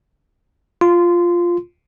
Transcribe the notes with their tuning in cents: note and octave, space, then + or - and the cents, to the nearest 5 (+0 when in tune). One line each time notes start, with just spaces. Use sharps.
F4 +0 C6 -15